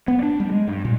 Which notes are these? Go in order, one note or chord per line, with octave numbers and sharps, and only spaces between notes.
B3
D4
G3
G#3
G2
A#2